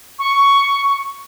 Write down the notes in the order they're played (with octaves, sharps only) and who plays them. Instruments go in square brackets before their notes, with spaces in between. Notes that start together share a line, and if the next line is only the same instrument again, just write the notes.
[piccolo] C#6